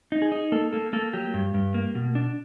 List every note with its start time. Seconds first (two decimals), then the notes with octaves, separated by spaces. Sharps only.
0.12 D#4
0.22 G#4
0.32 D#4
0.52 A#3 A4
0.73 A#3 A4
0.93 A#3 A4
1.13 F#3 G4
1.34 G2
1.54 G2
1.74 A#3
1.95 B2
2.15 D4